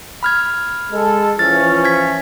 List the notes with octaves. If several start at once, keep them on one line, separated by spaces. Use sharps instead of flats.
B5 F6 G#6
G#3 A4
E3 F3 C#4 F6 A6
G#6 B6